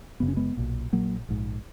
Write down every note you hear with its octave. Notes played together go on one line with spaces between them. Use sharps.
F#1 F#2 C#3 B3
C#4
G#3 B3
B1 A#2
A#1 A#2 F#3 A#3
A#1 G#2